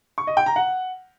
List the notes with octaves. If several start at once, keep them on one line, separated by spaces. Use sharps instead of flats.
C#6
D#5
G5
A#5
F#5